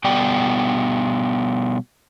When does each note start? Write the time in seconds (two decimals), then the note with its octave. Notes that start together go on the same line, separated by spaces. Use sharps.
0.04 B2 G3 B3 D5 G5